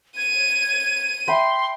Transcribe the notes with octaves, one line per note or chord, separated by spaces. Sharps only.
G#6 D#7
E5 G5 B5 C6